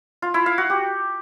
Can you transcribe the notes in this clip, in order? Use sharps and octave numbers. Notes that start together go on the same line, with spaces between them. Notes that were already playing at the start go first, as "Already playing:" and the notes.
F4
E4
F5
F#4
G4